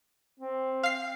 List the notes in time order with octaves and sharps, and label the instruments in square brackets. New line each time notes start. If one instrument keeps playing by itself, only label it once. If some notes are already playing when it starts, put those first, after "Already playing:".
[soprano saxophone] C4
[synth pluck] F5 C7